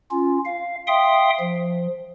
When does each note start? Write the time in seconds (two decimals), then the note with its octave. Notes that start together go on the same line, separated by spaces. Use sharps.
0.11 C#4 F4
0.45 F5
0.87 E5 F5 G5 C6 D#6
1.39 F3